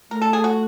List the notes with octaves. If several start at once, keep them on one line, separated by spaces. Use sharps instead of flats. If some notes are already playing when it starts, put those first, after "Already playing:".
A3 A#4
A4
G#4
F#4